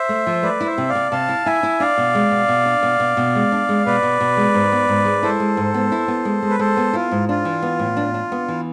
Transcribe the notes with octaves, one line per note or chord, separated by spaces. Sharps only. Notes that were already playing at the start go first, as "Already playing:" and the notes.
Already playing: C5 E5
A3
F3
A3 B4 D5
E4
C5 E5
C3
D5 F5
C3
C3 F5 A5
E4
E4 E5 G#5
E4
D4 D5 F5
B2
G#3
B2
B2
D4
B2
B2
B2
G#3
D4
G#3
B2 B4 D5
B2
B2
G#3
G#2
B3
G#2
G#3
E4 A4 C5
G#3
G#2
B3
E4
B3
G#3
G#3
B4
G#3 A4 C5
B3
E4 F4
G#2
D4 F4
E3
B3
A2
D4
D4
B3
E3